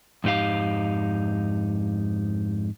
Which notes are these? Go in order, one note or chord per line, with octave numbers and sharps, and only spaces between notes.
F2 G#2 D#4 G4 F5